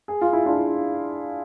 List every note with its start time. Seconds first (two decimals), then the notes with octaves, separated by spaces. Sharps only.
0.08 G#4
0.21 F4
0.33 E4
0.46 D4 F4